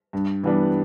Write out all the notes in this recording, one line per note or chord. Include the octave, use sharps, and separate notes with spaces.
G2
E3 G3 B3 D4